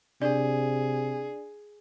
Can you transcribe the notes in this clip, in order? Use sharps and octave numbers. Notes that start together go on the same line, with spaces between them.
C3 D4 G#4 D5